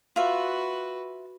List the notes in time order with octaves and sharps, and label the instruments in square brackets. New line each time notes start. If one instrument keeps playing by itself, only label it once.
[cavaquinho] F4 E5 [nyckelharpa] F#4 B4